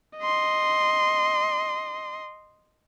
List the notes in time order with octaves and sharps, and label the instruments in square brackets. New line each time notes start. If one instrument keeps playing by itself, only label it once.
[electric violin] D#5 C6